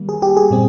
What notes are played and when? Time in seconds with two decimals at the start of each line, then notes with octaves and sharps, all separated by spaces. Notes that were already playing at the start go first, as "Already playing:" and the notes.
Already playing: D#3 G3 A#3
0.09 G#4
0.22 G4
0.37 G#4
0.51 A#2 G3 C4